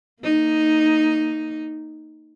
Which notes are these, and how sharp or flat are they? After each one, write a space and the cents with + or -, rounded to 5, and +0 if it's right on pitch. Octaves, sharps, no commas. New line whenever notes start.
A#3 -20 D#4 +0